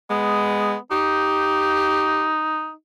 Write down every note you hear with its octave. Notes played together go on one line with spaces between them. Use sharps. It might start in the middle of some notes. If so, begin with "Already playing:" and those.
G#3 B3
D#4 G4